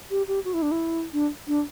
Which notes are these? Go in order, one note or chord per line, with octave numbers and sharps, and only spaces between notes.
G4
G4
F#4
E4
D4
E4
D4
D4